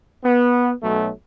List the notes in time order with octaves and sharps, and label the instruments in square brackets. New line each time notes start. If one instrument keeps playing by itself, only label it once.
[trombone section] B3
B1 F#3 A3